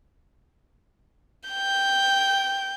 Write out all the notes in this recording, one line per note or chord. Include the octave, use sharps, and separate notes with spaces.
G5 G6